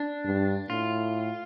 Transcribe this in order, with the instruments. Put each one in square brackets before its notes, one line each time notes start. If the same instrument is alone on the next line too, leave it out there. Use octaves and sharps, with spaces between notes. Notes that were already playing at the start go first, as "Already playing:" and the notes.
Already playing: [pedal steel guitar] D4
[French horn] G2
[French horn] A2 [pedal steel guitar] F4